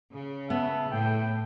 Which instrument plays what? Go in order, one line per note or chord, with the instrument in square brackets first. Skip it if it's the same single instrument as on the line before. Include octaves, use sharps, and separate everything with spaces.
[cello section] C#3
[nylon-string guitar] B3 [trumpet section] E5 A5
[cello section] A2 [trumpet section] G5